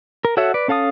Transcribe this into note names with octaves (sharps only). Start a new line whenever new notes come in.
A#4
F#4 A4 C#5 E5 F#5
B4 D5
C#4 A4 F5 A5 D#6